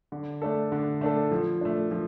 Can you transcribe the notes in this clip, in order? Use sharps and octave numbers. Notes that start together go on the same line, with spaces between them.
D3
A3 D4 A4
D3
A3 D4 A4
F3
A3 D4
F3